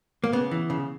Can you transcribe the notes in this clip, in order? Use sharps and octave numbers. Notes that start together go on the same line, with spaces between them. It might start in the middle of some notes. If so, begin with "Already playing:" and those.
A#3
C#3 B3
E3
C#3